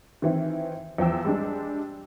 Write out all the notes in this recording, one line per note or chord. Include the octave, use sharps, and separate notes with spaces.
D#3 E3 C4
E2 F3 G5 E6
G3 G#3 D4